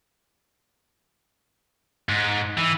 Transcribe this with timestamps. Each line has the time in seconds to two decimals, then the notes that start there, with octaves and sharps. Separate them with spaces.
2.09 G#2
2.58 E3